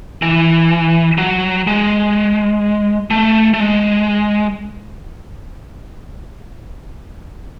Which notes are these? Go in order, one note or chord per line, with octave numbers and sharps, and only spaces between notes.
E3
F#3
G#3
A3
A3
G#3